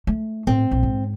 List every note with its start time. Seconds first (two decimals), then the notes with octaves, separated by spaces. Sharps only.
0.07 A3
0.47 A2 C4
0.71 A#1
0.83 G#2